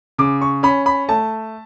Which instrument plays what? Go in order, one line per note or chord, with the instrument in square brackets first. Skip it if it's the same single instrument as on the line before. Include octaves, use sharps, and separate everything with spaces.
[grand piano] C#3 D6
C#6
C#4 B5
B5
A3 A5